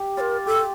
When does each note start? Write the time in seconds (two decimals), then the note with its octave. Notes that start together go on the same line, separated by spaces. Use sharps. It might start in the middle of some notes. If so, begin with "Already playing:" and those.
Already playing: G4
0.17 F4 C#5
0.20 A#4
0.46 G4 A4